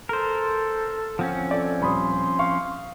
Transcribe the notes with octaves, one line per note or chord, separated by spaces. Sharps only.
A4 A#4 C5
F3 C4 C#4 F#5
A4 D5
D#1 B5 C6 D#6
F5 C#6